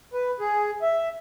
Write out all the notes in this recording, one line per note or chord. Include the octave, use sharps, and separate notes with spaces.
B4
G#4
E5